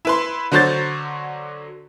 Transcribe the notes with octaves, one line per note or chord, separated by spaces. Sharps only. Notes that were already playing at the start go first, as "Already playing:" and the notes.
E4 B4 C6
D3 F#3 C5 C#5 G6 A6